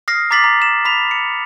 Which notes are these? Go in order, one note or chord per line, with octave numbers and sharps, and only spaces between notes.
D#6 F6 A#6 C7
A#5 D6 A6 B6 C7 F#7
A#5
E7
B5 B6 F7
C#7